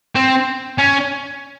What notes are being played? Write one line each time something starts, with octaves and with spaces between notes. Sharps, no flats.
C4
C#4